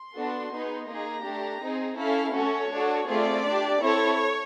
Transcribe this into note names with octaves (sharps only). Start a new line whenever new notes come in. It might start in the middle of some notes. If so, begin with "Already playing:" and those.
Already playing: C6
B3 D4 F#4 A4
B3 D#4 G#4
A#3 D#4 G#4 A#5
A3 D4 G4
C4 D#4 G#4
C#4 E4 A4 F5
A3 C#4 F#4 A4 C#5
D4 F#4 A4
A3 C4 F4 G#4 D5
D4 G4
C4 E4 A4 C#5